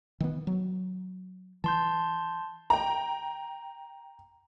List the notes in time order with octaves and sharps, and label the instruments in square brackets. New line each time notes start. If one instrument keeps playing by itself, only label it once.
[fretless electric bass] D#3 E3 B3
F#3
[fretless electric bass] E3 [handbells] A5 C6 G6
[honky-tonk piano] G5 A#5